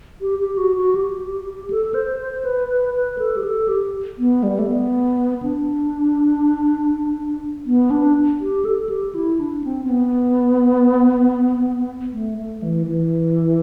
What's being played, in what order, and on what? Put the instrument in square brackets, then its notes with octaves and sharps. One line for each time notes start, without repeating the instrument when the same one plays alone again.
[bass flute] G4
G4
F#4
F#4
G4
A4
C5
C5
B4
B4
B4
A4
G4
A4
G4
B3
G3
A3
B3
D4
B3
D4
G4
A4
G4
E4
D4
C4
C4
B3
A3
A3
E3
E3